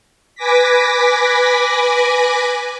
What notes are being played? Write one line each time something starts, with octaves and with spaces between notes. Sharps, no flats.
B4 G#5 D6 A#6 B6